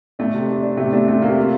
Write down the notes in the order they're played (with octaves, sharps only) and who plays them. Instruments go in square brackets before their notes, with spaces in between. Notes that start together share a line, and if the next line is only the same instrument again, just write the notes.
[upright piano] A3 [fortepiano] D4
[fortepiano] C3
D4
D4
[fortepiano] C3 [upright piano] A3
[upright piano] A3 [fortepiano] D4
[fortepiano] C3 [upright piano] A3
[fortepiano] C3 [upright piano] A#3
[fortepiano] F4